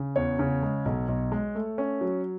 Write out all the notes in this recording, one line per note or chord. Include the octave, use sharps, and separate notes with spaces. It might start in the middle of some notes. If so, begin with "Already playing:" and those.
Already playing: C#3
E2 C#5
C#3
G#3
B1
B1
G#3
A3
C#4
F#3